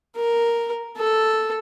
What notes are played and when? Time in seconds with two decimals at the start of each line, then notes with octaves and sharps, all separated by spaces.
0.16 A#4
0.98 A4